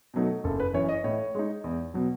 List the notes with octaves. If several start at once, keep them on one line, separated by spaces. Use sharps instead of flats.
B2 F#3 A3 D#4
F#1 A4
B4
F#2 E3 C#5
D#5
A2 C#5
G#3 D#4
E2
B2 F#3